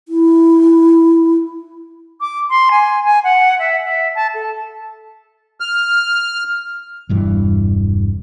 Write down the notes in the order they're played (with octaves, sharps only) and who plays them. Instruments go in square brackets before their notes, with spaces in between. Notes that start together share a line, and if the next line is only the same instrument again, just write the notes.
[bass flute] E4
[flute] D6
C6
G#5
G#5
F#5
E5
E5
A5
A4
[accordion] F6
[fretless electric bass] E1 G2 E3